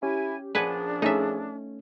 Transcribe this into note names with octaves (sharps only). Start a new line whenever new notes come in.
C#4 E4 G4 G#5
A#2 F3 D4 G#4 B4 F#5 G#5
A3 C#4 D#4 E5